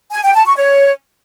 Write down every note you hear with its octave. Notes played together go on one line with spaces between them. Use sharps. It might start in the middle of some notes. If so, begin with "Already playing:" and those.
G#5
G5
A5
C#6
C#5